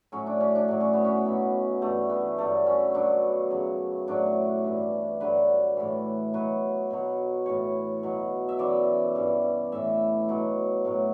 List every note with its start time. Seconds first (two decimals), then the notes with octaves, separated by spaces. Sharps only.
0.12 A2 F#3 C#4
0.26 D4
0.40 C#4
0.55 D4
0.68 A2 F#3 D4
0.80 C#4
0.93 B3
1.05 C#4
1.25 B2 F#3
1.82 G2 E3 A3
2.10 B3
2.38 G2 D3 F#3 A3
2.67 C#4
2.94 B2 F#3 D4
3.50 F#2 C#3 F#3
4.07 A2 F#3 D4
4.64 G2 E3
5.20 G2 D3 F#3 B4
5.76 A2 E3
6.34 B2 F#3 B4
6.90 B2 F#3
7.46 A2 E3 C#5
8.03 B2 F#3
8.49 E5
8.59 F#2 E3 D5
9.15 G2 E3
9.72 A2 E3 E5
10.28 B2 F#3
10.85 A2 F#3